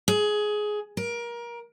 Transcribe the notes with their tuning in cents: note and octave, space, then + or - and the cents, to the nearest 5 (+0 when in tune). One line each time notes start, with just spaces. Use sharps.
G#4 +15
A#4 +25